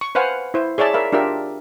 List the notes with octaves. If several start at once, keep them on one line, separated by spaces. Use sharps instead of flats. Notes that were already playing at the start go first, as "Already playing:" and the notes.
C#6
B4 C5 F5 F#5 G#5
E4 C5
G#4 C#5 D5 E5 A5
A#4 E5 F5 B5
D4 F4 G4 A#4 E5